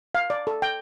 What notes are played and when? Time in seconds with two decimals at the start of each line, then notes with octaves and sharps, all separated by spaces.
0.15 F5
0.30 D5
0.47 A4
0.62 G5